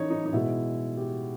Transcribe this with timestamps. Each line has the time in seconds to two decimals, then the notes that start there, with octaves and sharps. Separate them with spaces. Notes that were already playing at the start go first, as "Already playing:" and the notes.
Already playing: C#3 E3 D#4 C#5
0.10 D#4
0.26 D#4
0.33 B2 G#3 E4
0.97 G4